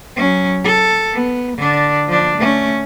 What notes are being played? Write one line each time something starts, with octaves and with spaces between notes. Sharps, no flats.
F#3 C#4
A4
B3
D3 D4
F3 D4
A3 C#4